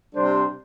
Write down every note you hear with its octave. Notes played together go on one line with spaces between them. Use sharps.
C3 G3 D4 C5